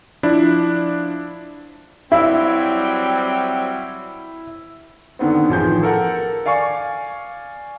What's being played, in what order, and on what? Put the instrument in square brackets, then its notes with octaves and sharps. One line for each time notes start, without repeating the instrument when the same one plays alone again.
[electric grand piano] F3 D4 E4
[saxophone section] F#3 G3 C4 [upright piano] E4
[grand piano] D3 D#3 B3 C4
A1 D#3 F3 G#4 G6
A4 A#4 F#5
D5 F5 G#5 C#6